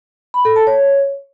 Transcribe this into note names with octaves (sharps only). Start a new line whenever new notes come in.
B5
A4
A5
C#5